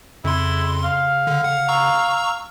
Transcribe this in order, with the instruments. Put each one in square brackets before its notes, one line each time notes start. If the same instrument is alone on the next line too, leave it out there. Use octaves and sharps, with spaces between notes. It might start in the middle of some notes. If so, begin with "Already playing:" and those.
[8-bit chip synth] F2 C6 [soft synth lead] C#3 [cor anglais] E4
[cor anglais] F5
[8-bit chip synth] D3
F#5
A#5 C#6 E6